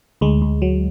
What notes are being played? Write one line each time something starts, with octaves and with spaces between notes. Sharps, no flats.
D2 G#3
D2
F#3